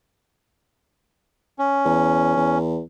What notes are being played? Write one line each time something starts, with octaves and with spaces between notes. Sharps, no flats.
C#4
E2
E2